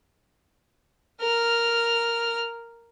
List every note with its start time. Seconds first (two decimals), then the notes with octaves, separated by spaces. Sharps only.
1.21 A#4 F6